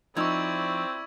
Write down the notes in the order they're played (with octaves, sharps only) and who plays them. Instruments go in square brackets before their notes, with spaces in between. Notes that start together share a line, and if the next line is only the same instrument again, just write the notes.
[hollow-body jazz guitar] F3 D#4 [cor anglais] C4 [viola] E4 D5 [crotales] C#6 E6 G#6